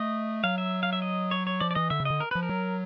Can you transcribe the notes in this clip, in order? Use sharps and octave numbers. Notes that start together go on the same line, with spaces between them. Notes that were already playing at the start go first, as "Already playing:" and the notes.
Already playing: A3 D#5
F#3 F5
E5
F5
E5
D#5
C#5
C#5
F3 D5
D5
E3 D#5
D3 E5
C#3
D3 D#5
A#4
F3 B4
A#4
F#3